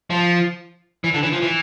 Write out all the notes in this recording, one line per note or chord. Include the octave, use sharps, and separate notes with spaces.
F3
E3
D3
E3
F3
E3